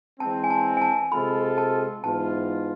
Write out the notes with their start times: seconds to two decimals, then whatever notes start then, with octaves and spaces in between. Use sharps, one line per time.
0.20 E3 G#3 C4 A5
0.44 G#5
0.50 A5
0.77 G#5
0.82 A5
1.12 C3 G#3 C4 F4 A4 B5
1.58 A5
2.04 G#2 E3 B3 F4 A5